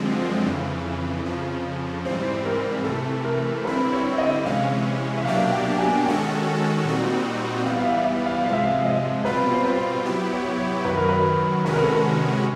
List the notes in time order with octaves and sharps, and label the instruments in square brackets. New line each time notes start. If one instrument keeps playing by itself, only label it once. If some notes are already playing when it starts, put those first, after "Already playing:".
Already playing: [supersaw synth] F#2 D3 F3 G#3 C4
F2 C#3 E3
F2 C#3 F3
[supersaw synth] G#2 E3 G3 C4 [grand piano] C5
[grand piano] A#4
[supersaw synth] C3 E3 A3 [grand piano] A4
[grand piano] A#4
[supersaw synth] D3 G3 C4 E4 [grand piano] B4
[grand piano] C#5
D#5
[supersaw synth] C3 E3 G#3 C#4 [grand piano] F5
[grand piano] E5
[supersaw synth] B2 F#3 A#3 D4 G4 [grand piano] F5
[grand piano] G5
G#5
[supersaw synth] D#3 G#3 C#4 F#4 A4 [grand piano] G5
[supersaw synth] A#2 G3 C4 D#4 F#4
[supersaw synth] E3 G3 B3 [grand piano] F5
[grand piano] F5
E5
E5
F5
[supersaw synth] C3 F3 G#3 [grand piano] F5
[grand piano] E5
F5
D#5
[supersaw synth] B2 G3 C4 F4 [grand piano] B4
[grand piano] C5
B4
[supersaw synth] F#3 B3 E4 G4
[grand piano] C#5
C#5
[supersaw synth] F#2 D#3 F#3 [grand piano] B4
[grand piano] A#4
B4
[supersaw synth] C3 D#3 G#3 C#4 F#4 [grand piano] B4
[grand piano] A#4
A4
A#4